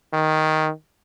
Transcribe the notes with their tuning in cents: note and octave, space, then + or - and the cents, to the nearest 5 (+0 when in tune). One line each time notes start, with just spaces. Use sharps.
D#3 +5